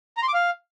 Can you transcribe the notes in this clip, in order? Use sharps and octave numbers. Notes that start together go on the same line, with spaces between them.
A#5
C6
D6
F5